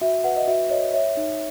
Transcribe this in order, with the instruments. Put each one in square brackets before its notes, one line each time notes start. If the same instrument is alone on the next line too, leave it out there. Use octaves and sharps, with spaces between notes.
[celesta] F#4 E5
B4 F#5
D#5
F#4 E5
C#5 D#5
C#5 E5
D#4